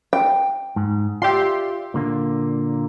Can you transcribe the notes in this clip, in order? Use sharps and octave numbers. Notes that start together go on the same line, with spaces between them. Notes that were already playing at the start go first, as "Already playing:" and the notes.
G5
G#2
F4 G4 D5 E5 C6
A#2 D3 A#3